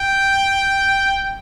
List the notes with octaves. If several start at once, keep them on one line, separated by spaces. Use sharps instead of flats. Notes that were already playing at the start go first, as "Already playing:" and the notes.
Already playing: G5